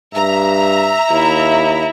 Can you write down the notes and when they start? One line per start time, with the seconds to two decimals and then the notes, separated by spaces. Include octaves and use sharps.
0.14 G2 E5 A#5
1.11 D#2 E4